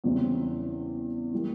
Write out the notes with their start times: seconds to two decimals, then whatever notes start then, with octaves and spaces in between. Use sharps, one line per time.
0.04 E2 C#3 E3 G3 C4
1.33 E3 G3 A#3